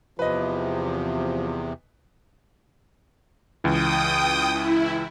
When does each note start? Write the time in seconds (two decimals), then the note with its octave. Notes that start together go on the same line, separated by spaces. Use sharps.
0.19 E2 C3 F3 B4 D#5
3.64 C#2 E3 G5 D#6
4.52 E4